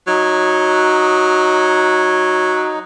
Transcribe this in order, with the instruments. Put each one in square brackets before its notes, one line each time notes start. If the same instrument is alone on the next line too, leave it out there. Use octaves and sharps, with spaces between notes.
[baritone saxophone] F#3 [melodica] D#4